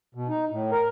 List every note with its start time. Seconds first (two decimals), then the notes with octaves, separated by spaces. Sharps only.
0.15 B2
0.29 D#4
0.51 A2
0.72 A#4